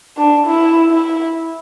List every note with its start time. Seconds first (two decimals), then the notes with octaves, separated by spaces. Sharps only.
0.17 D4
0.47 E4
0.91 E4